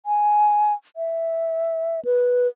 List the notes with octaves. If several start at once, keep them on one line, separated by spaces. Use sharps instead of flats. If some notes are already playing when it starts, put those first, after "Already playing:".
G#5
E5
B4